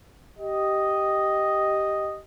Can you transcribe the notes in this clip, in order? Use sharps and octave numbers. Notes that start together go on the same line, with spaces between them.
G4 D#5